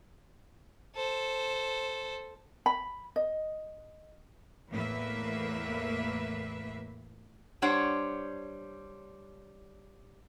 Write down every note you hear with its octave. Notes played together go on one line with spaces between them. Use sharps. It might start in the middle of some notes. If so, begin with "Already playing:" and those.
A4 C5
B5
D#5
E2 A2 A#3 B4 E5
G3 D4 C5 C#5 F#5